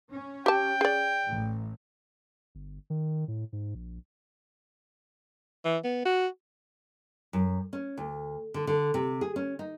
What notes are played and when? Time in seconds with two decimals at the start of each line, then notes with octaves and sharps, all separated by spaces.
0.10 C#4
0.46 G4 G5 A5
0.81 G#4 D5
1.28 A1
2.55 G1
2.90 D#3
3.28 A2
3.53 G#2
3.75 A#1
5.65 E3
5.84 B3
6.05 F#4
7.33 F#2
7.73 C#4
7.97 D2
8.54 D3
8.67 D3
8.94 C3
9.21 G#4
9.36 C#4
9.59 D#4